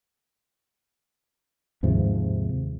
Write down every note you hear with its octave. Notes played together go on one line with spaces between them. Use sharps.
D#2 G#2 C3 F3